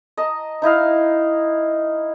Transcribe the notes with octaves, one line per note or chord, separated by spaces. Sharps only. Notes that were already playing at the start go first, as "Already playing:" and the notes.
D#5 A5 A#5
D#4 E4 D#5 F5